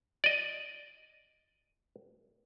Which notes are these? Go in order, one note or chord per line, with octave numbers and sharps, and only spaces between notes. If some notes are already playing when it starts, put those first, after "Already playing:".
D5 D#5